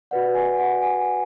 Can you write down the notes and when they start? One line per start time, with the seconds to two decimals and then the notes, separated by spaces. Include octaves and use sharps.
0.11 F#4 B4 D5 F#5
0.35 G#5
0.58 F#5
0.82 G#5